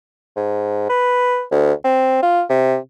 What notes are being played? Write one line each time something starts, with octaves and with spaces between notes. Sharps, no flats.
G#2
B4
D2
C4
F4
C3